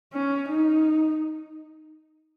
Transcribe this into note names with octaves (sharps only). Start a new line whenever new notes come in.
C#4
D#4